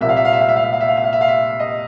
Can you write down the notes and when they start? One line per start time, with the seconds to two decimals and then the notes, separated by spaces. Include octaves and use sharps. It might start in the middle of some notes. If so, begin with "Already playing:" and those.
0.01 C2 A#2 F3 A#3 E5
0.09 F5
0.17 E5
0.25 F5
0.33 E5
0.41 F5
0.49 E5
0.56 F5
0.64 E5
0.73 F5
0.80 E5
0.88 F5
0.97 E5
1.04 F5
1.13 E5
1.21 F5
1.28 E5
1.60 D#5